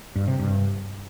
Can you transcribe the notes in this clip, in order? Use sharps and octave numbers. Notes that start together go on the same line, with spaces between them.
G2
C3
G2